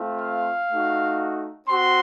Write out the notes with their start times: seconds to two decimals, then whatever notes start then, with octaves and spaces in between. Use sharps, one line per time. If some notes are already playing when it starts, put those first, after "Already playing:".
Already playing: A3 C4 F4
0.21 F5
0.70 A3 D#4 F#4
1.69 C4 F#4 C6